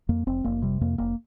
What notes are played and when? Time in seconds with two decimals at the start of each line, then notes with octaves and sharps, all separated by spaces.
0.09 F2 A#3
0.27 F1 C4
0.44 F1 A#3
0.62 C3 G3
0.81 F2 A#3
0.98 F1 A#3